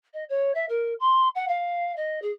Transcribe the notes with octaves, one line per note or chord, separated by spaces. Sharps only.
D#5
C#5
E5
A#4
C6
F#5
F5
D#5
G#4